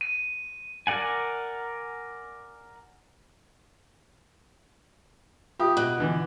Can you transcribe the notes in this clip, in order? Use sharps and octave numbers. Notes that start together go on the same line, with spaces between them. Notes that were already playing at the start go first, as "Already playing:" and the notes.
D#7
A#4 D5 F#5 G#5
F4 G4 E5 D#6
B2 F#6
D3 E3